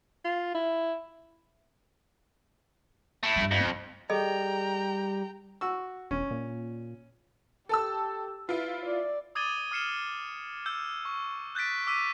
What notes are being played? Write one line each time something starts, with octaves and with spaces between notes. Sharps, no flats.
F4
E4
A3 E4
G2 G3
F2
D4
G3 G#4 A4 D#5 G5 A#5
F#4 E6
E1 C#4
A#2
G4 A4 A5 E6
E4 F4 B4
D5
D6 D#6 G#6 A6 D#7 G7
D#6 F6 C7 C#7 E7 G7
E6 G6
C#6
F#6 G6 A6 B6 D7
D6 E6 B6 D#7